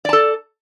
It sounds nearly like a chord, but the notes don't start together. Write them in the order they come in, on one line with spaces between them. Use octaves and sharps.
D5 A5 A4